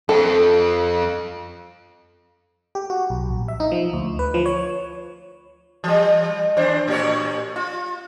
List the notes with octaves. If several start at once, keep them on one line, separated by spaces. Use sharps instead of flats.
F2 A4
G4
F#4
B1
A#1
E5
D#4
F3
D2
B4
F3
C#5
E3 G3
D#2 D4 C5
A2 G4 C#5
F4